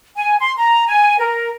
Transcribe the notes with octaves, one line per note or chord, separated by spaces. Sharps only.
G#5
C6
A#5
G#5
A#4